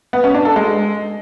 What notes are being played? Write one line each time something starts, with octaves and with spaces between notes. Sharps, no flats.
B3
C#4
D4
A4
G#3